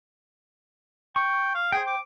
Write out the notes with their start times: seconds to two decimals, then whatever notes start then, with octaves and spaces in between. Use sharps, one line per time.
1.16 G5 C#6
1.55 F5
1.72 G#4 C5 G5
1.87 D6